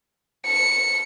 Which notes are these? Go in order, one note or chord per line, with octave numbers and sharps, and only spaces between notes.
C#7